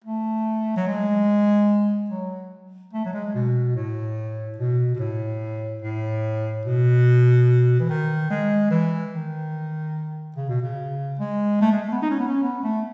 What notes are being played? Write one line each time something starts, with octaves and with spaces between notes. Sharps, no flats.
A3
F#3
G#3
F#3
A3
F#3
G#3
B2
A2
B2
B2
A2
A2
B2
E3
D#3
G#3
E3
D#3
C#3
B2
C#3
G#3
A3
G#3
A3
B3
D#4
C#4
B3
C#4
B3
A3